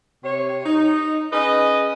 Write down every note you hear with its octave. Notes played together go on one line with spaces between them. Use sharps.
C3 C#5
D#4
C#4 G#4 B4 D#5